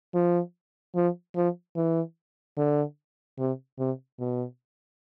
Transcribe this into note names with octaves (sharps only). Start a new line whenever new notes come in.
F3
F3
F3
E3
D3
C3
C3
B2